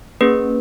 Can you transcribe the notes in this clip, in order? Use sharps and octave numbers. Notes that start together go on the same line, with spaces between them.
A#3 C#4 G#4 B4